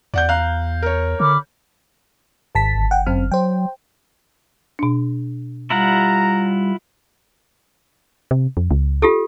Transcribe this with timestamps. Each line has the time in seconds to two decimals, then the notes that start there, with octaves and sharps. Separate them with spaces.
0.14 E2 D5 F#5 G6
0.29 F5 A#5 F#6
0.82 A#4 C#5
1.20 D3 B5 D6 F6
2.55 G#1 A5 B6
2.74 G1
2.91 F#5 G5
3.06 F#2 C4 F6
3.32 F#3 C5 G5
4.79 B2 D4
5.70 G3 E4 F4 F#5 A#5
8.31 C3
8.57 F2
8.71 C#2
9.02 F4 G4 A4